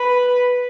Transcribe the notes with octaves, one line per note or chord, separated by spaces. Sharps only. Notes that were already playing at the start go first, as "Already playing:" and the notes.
Already playing: B4